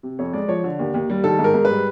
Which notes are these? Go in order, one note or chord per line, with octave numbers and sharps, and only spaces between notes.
C3
F2 C#5
G#3 D5
F3 C#5
D3
D#2
D#2
G3
D#3 A4
G#2
A#4
G#2
G3 B4